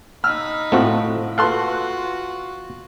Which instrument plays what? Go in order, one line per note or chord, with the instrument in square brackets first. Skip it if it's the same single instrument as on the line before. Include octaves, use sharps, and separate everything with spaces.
[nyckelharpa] D#4 B5 [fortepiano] E6 F6
[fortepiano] A2 F4 [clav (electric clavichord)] A3 C4 F#4
[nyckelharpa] F4 F#4 [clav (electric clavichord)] A4 F5 [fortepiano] B4 C6 F#6